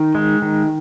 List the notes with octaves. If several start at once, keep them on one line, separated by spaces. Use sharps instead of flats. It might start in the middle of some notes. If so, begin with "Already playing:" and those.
Already playing: D#3
G#3
D#3